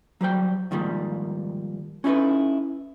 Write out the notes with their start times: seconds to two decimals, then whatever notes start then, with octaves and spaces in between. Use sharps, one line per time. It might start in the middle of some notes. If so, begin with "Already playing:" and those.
0.21 F#3 G3 C5 G5
0.71 G#2 D#3 F3 G3 A#3
2.04 C#4 D#4 E4 F#4 A4 B4